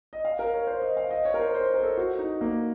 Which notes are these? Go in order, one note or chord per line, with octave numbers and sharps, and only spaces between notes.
D#5
F5
A#4
C#5
C5
D#5
F5
D#5
C#5
A#4
C5
C5
A#4
A4
F#4
D#4
A#3